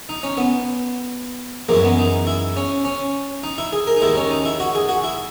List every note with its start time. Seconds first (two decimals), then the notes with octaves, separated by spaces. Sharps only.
0.09 D#4
0.23 C#4
0.38 B3
1.69 F#2 E3 G#3 A#3
1.84 B3
1.99 D#4
2.27 E4
2.57 C#4
2.85 C#4
3.43 D#4
3.58 E4
3.73 G#4
3.87 A#4
3.97 D#4
4.01 D#2 D#3 G#3 E4
4.17 C#4
4.31 D#4
4.45 E4
4.60 F#4
4.75 G#4
4.89 F#4
5.04 E4